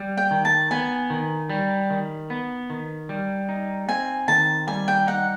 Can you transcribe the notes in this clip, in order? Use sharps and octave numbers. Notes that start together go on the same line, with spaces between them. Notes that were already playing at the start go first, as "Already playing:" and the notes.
Already playing: G3
G5
D#3
A5
B3 G#5
D#3
G3
D#3
B3
D#3
G3
D#4
C4 G#5
D#3 A5
G3 G#5
G5
D#4 F#5